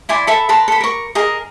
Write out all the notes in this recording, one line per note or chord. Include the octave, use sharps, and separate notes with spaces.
E4 D5 G#5 C6
A4 E5 B5
A#4 B4 A5 C6
A4 B5
A#4 C#6
G#4 A#4 D#5